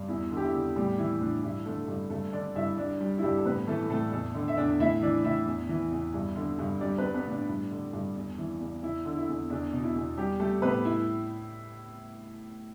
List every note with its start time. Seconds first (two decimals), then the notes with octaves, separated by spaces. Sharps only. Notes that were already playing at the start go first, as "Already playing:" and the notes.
Already playing: G2
0.08 E2 E4
0.31 D3
0.37 G4
0.43 E4
0.54 E2
0.76 A2 G3 G4
0.98 E3 E4
1.21 A2 D4
1.43 G2 E4
1.66 D3 A3 A4
1.88 G2
2.10 G2 A3 A4
2.33 D3 D4 D5
2.56 G2 E4 E5
2.77 G3 D4 D5
3.01 G3
3.18 E4
3.22 G2 G3 G4
3.38 A4
3.45 A2 B3 B4
3.67 E3 A3 A4
3.90 A2 A3 A4
4.12 E2 A3 A4
4.35 D3
4.48 E5
4.57 E2 D4 D5
4.80 A2 E4 E5
5.02 E3 D4 D5
5.24 A2 E4 E5
5.46 E2
5.69 E3
5.92 E2
6.14 G2
6.36 D3
6.59 G2
6.81 G3 D4 D5
6.98 B3 B4
7.04 G3
7.14 B3 B4
7.27 A2
7.32 D4 D5
7.49 G2
7.71 D3
7.93 G2
8.16 E2
8.38 E3
8.61 E2
8.83 E2 E4 E5
9.05 D3
9.16 E4
9.28 E2
9.50 E2 D4
9.73 B2
9.83 E4
9.95 E2
10.18 G3 G4
10.40 G3 A3 A4
10.62 A2 B3 B4
10.85 E4 E5